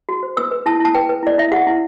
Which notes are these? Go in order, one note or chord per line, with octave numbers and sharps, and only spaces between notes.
F#4
C5
B4 E6
B4
E4 A5
E4 A5
B4 G5
B4
E4 D5
E4 E5
G4 F#5
E4